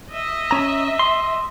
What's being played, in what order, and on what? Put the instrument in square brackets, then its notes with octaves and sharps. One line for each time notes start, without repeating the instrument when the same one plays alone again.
[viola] D#5 E5
[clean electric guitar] C#4 A#5
C6